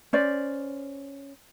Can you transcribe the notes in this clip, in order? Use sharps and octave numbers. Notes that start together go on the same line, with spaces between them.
C#4 C5 D5